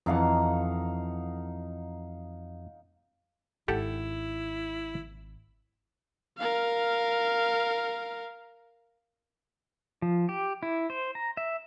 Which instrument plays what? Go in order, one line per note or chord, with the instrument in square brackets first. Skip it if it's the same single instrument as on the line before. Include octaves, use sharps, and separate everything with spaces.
[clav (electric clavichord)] F2 E3 [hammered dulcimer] D#4 F5 F#5
[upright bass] G#1 [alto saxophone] E4 [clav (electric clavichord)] G4 A4 F#5
[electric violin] A#4 F5
[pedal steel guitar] F3
G4
E4
C5
A#5
E5